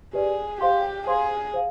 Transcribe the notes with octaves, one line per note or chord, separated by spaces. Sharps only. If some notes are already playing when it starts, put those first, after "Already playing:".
G4 G#4 B4 D5
G4 C5 F5 C6
G#4 C5 F5 C6
C5 F5